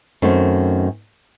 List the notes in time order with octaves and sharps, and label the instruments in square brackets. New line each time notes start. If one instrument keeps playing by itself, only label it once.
[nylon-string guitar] F#2 D#3 A3 C4